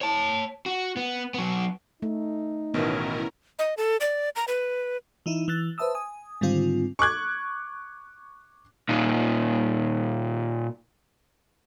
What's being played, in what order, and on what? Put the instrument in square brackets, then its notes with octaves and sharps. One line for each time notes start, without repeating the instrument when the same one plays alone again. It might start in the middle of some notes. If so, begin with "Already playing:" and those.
[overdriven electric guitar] C#5 A5
F#4
B3
F#3 B3
[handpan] A3 [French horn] D#4
[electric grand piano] A1 B2 D#3 [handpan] B3 [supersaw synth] C#4 E4 A#4
[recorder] D#5
A4
D5
A#5
B4
[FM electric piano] E3 D#4 E4
E3 E6 F#6 A6
B4 C5 E5 A5 D#6 E6
G#5 D#6
G#2 D3 D#3 G3 C4 F4
[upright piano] C#6 D6 F#6 G#6
[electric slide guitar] A#2 D#4 F4